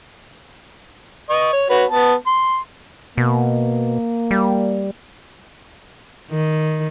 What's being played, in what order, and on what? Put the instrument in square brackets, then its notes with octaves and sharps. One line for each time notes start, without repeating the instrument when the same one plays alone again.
[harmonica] D#5 C#6
C#5
F#4 B4 C#5
B3 A5
C6
[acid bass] B2 [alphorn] A#3
[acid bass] G3
[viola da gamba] D#3